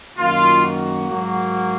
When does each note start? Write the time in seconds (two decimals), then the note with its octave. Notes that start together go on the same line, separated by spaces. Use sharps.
0.18 F#2 D#3 A#3 F4
0.64 F#4
1.09 G#2 F#3 A#3